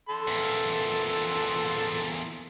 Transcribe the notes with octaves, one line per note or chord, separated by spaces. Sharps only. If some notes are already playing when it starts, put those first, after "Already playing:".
A4 C6
E2 A#2